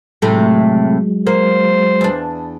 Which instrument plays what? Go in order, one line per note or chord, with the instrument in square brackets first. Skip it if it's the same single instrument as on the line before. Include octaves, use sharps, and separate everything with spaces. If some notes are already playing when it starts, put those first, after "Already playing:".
[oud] A2 C3 A3 [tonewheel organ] F#3 G#3
[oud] A#3 [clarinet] C5
[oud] E2 D4